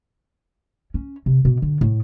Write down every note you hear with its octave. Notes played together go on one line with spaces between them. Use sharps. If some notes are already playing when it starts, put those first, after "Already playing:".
C#4
C3
B2
D3
A2